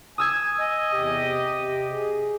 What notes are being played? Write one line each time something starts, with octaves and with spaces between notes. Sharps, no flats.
G#5 D#6 E6 G#6
D#5 G#5
E2 C3 G4
C3
G#4